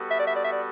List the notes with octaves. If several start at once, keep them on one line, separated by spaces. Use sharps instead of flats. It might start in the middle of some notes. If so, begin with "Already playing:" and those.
Already playing: G3 B3 F#4 A4
E5
D5
E5
D5
E5
D5